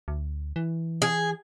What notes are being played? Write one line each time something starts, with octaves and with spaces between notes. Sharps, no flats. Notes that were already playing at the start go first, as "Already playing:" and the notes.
D2
E3
G#4